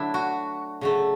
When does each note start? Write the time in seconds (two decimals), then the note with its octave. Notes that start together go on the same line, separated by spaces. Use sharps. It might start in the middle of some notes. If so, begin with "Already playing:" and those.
Already playing: D3 F#3 A3 D4 E4
0.14 F#4
0.81 C#3 F#3 A3